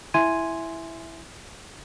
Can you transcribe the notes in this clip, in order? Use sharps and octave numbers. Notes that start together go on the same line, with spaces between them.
E4 E5 G#5 C6 G#6 D#7